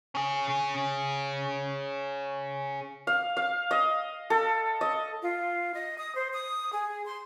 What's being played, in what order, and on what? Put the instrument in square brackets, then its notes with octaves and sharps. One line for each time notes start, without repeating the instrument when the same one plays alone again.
[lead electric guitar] C#4 G#4
[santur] F5
F5
D#5
A4
D#5
[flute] F4
D#5
D#6
C5
D#6
G#4
C6